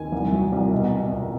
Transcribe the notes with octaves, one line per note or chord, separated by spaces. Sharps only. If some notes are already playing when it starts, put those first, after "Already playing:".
Already playing: D#2 G#5
C2
F#3
C2
B2
B2
C#2